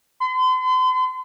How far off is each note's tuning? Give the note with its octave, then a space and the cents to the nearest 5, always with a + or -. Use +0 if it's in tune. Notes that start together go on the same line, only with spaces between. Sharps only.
C6 -40